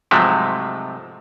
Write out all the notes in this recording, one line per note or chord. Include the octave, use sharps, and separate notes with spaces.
G#2 C3 F3 F#3 G#3 A3